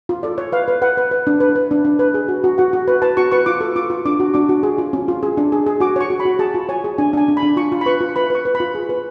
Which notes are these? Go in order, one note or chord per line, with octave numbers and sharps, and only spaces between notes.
F4
A4 D5
C#5
B4 F5
B4
B4 F#5
B4
B4
D4
B4
B4
D4
D4
B4
G#4
F#4
F#4
F#4 F#5
F#4
B4
B4 A5
F#4 C#6
B4 C#6
F4 D6
A4
F4 D6
F4
D4 D6
F#4
D4 D6
F#4
G#4
F4
C#4
F4
G#4
D4
G#4
G#4
F#4 D6
C#5 C#6
F#4
B5
F#4
G#4 A5
F4
C#5 G#5
G#4
D4 G#5
D4 G#5
D4
B5
D4
F4 C#6
F4
B5
B4 C#6
F4
B4 B5
B4 C#6
B4
B5
F4
G#4
B4